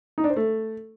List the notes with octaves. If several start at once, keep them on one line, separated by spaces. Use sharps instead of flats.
D#4
D4
C5
A3